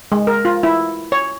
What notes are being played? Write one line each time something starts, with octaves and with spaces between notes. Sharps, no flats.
G#3
A#4
F4
E4
C#5